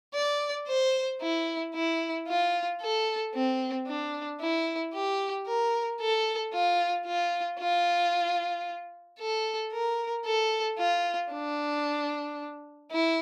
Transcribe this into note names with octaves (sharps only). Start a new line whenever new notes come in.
D5
C5
E4
E4
F4
A4
C4
D4
E4
G4
A#4
A4
F4
F4
F4
A4
A#4
A4
F4
D4
E4